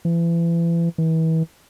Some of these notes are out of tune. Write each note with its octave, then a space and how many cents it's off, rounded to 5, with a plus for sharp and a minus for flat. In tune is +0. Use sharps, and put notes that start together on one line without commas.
E3 +35
E3 -35